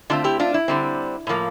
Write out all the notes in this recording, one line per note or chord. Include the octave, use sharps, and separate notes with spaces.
D3 A3 C4 D4 F4
E4 G4
D4 F4
E4
D3 G3 C4
A2 F3 A#3